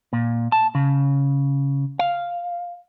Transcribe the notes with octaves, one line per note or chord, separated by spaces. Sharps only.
A#2
A5
C#3
F5